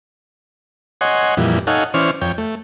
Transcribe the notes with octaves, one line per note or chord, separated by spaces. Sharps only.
C#5 D#5 F#5 G#5 C6
F2 A#2 E3 G3
D#4 A4 C#5 F5 F#5 G#5
E3 C#4 C5 D5 C#6 F6
F2 C#5 G5
A3